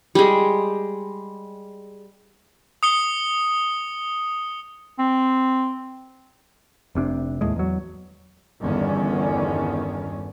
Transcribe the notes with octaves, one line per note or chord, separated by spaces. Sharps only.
G3 G#3
D#6 C#7 G7
C4
F1 C3 C#4 D4
D#2 A2 G#3
E2 F#3
G1 E2 G2 D3 D#3 C#4